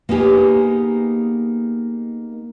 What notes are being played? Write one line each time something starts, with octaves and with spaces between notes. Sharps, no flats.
A#3 B3 D#4 G4 G#4